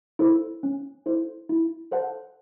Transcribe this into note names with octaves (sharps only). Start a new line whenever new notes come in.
E4 A4 C5
C#4
E4 A4 C5
E4
A4 C5 F#5 A5